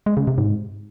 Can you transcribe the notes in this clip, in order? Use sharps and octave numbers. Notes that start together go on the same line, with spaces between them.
G#3
C#3
C3
G#2